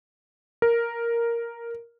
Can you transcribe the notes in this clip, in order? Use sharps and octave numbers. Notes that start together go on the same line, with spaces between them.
A#4